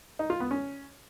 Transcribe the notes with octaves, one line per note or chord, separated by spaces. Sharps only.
D#4
F4
B3
C#4